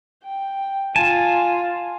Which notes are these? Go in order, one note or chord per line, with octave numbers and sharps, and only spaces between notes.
G5
F4 G#5 A5